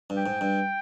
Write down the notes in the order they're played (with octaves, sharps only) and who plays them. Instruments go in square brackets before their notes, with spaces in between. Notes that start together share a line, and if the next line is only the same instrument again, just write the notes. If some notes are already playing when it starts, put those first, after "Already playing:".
[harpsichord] G2
[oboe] G5
[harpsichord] G#2
G2